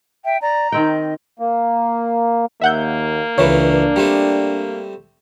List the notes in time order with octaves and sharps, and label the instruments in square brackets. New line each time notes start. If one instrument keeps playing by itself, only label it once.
[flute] E5 [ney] G5
[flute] D5 [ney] A#5
[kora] D#3 C4 G5 [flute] D#5
[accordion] A#3
[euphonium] D#2 [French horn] A#3 [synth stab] E5 F#5 G6
[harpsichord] C#2 E3 A3 [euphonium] D4 [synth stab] B4 C#5
[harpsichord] G3 A3 C4